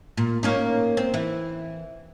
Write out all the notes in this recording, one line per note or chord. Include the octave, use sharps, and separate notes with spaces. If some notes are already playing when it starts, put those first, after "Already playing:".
A#2
A#3 C#4 D#4
C4
E3